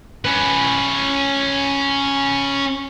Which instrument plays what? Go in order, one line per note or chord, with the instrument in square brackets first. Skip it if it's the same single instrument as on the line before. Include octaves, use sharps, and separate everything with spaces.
[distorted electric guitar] C#4 B4